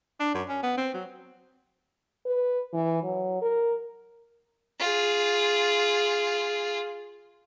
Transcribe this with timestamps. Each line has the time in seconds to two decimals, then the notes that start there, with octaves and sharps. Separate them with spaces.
0.20 D4
0.34 F#2
0.49 C#4
0.63 B3
0.77 C4
0.94 F#3
2.26 B4
2.73 E3
3.03 F#3
3.42 A#4
4.80 F4 G#4